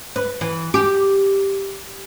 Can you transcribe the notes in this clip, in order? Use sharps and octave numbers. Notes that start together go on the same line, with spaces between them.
B4
E3
G4